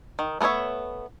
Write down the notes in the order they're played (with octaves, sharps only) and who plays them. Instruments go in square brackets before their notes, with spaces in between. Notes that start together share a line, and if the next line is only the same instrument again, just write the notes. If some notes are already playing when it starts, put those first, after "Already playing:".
[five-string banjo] D#3
A3 B3 A4 C#5 E5